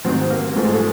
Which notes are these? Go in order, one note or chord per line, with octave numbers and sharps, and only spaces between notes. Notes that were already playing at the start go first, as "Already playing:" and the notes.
G#2 D#3 F#3 C4
A#3
G#2 F3 A3
G#3
A3